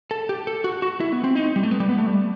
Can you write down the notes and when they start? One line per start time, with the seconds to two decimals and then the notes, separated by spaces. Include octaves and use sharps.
0.11 A4
0.29 G4
0.47 A4
0.64 F#4
0.82 F#4
1.00 E4
1.12 B3
1.24 C4
1.36 D#4
1.56 G3
1.63 A3
1.71 B3
1.80 G3
1.89 B3
1.98 A3
2.06 G3